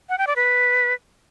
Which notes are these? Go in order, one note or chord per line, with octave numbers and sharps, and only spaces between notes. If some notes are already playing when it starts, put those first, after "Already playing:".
F#5
G5
D5
B4